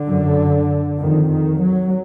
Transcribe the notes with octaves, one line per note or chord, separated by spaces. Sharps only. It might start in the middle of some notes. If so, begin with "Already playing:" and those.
Already playing: D3
F#2
F2 D#3
D#3
F#3